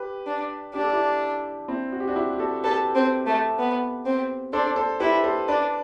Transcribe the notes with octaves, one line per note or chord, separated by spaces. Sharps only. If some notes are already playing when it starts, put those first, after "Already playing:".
Already playing: G4 B4
D4
D4 G4
A4
E4 G4
C4 E4
F#4
G4
D4 F#4
E4 G4
G4
F#4 A4
G4 A4 B4
C4
A3
B3
C4
D4 A4 C5
A4 C5
E4 G4 B4
A4 C5
D4 B4 D5